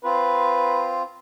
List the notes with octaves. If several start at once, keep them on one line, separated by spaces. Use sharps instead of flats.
C4 F4 B4